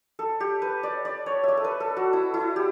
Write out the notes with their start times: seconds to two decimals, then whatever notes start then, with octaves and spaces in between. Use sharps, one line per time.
0.19 A4
0.40 G4
0.62 B4
0.83 D5
1.05 D5
1.26 C#5
1.43 D5 E5
1.57 A4
1.64 B4
1.80 A4
1.97 F#4
2.13 E4
2.34 E4
2.56 G4